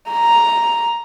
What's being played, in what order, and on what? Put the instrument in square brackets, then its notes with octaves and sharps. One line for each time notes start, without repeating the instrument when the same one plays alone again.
[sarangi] A#5